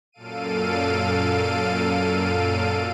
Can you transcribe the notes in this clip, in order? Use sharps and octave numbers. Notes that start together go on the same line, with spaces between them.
F#2 A#2 A4 F5 D7 D#7